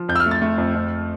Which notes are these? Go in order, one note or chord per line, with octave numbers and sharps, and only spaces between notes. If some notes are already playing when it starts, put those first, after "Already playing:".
Already playing: F3
F2 G6
E6
F6
A3
A6
A3
F2
F2